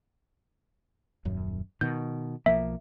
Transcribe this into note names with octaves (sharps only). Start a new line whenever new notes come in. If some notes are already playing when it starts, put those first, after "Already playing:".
D#1 F#2
B2 D#3 G6
B1 F3 A#3 E5